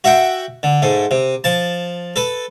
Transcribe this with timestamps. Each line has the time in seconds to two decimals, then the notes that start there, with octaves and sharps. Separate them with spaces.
0.04 F#4 E5 F#5 G5
0.63 D3
0.82 G#2 A3
1.11 C3
1.44 F3 A5
2.16 A4 B4